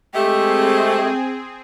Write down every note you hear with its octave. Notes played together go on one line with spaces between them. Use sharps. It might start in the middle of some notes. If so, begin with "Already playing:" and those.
G#3 A3 C4 G4 G#4 G5